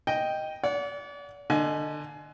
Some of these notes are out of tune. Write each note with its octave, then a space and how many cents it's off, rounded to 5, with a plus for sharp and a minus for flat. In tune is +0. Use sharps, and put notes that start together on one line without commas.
D#5 +0 G5 +0
D5 -40 F#5 -15
D3 +25 D#5 +0 G#5 +30